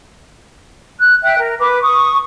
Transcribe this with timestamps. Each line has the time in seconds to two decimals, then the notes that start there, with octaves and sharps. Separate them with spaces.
0.99 F#6
1.23 E5 G5 F#6
1.39 A#4
1.59 B4 D6
1.83 C#6 D#6